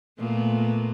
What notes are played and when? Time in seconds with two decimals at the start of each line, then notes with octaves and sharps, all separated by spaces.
0.18 A#2 A3 B3